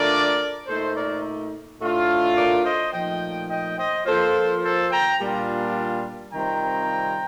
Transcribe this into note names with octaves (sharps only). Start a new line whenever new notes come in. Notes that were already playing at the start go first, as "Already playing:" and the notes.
Already playing: D3 A3 D4 F4 A#4 D5
A#2 A3 D#4 A4 C5
A#4 D5
A2 A3 D4 F4
A#4 D5
C5 D#5
A#2 F3 A3 D#4 D#5 G5
D#5 G5
C5 D#5
F3 A#3 F4 A4 C5
A4 C5
G5 A#5
A#2 G3 D4 F4
C3 D#3 G3 C4 F4 G5 A#5